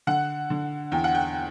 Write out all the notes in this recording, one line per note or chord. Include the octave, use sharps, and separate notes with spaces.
D3 F#5
D3
E2 G5
F#5
G5